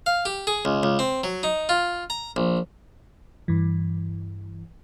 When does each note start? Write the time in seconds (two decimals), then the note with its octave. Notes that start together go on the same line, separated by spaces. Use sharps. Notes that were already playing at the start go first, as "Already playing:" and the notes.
0.06 F5
0.25 G4
0.47 G#4
0.65 C#2
0.83 C#2
0.99 C4
1.24 F#3
1.43 D#4
1.69 F4
2.10 A#5
2.36 A#1
3.48 G2 E3